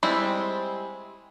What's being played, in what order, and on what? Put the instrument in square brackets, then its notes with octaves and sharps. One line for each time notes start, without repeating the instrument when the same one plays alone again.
[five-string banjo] G3 G#3 C4 E4